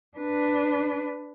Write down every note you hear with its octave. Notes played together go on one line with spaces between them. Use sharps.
D4 B4